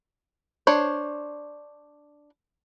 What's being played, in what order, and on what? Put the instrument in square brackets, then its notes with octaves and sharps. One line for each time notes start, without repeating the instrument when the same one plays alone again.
[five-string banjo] D4 C5 C#5